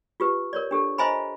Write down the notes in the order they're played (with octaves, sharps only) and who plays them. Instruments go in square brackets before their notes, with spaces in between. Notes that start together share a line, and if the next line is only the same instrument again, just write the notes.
[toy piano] F4 G4 B4
A#4 C#5 D5
D4 G4 A4
C5 D#5 E5 G#5 A#5 B5